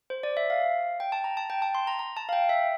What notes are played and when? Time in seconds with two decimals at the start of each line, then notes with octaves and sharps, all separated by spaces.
0.10 C5
0.23 D5
0.37 E5
0.50 F5
1.00 G5
1.12 A5
1.24 A#5
1.37 A5
1.50 G5
1.62 A5
1.75 C6
1.87 A#5
1.99 A#5
2.17 A5
2.29 F5
2.33 G5
2.49 E5